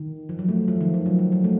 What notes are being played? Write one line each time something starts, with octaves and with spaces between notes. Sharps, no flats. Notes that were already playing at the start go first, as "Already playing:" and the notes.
Already playing: D#3
F3
F#3
A3
F3
D#3
F3
F#3
F#3
F#3
A3